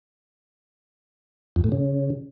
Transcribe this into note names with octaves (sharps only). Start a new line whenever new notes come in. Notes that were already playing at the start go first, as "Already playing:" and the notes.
F2
A2
C#3